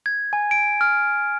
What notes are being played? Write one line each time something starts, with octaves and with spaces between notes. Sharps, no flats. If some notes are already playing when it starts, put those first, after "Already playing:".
G#6
G#5
D7
F6